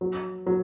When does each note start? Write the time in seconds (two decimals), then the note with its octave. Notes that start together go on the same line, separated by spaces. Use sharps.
0.01 F#3
0.46 F#3